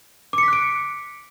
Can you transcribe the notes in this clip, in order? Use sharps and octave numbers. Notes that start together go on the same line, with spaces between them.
D6 F#6 B6 C#7 D7